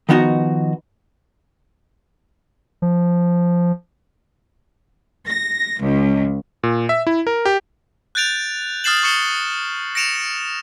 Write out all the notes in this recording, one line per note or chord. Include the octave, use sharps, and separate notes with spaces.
D#3 F3 B3 D#4 F#4 D#5
F3
A#6
C#2
A#2
E5
E4
A#4
G4
F#6 G6 A6 D7 F7
D#6 F6 A6 C7 E7 F#7
C#6 D#6 C7 C#7 E7 G7
A#6 C#7 D7 E7 F7